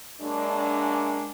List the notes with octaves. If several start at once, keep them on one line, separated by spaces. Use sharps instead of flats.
F#2 G#3 A#3 D4